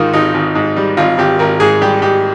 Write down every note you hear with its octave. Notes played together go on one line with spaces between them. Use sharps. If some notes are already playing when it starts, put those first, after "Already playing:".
Already playing: G#2 D#3 F4 A#4
G#1 D#4
G#1
G#2
G3
G#1 F4
G#1 G4
G#1 A#4
G#2 G#4
G3 G4
G#2 G4